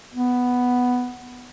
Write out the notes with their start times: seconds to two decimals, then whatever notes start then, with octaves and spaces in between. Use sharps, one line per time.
0.14 B3